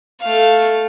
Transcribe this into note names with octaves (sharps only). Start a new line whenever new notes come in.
A3 F5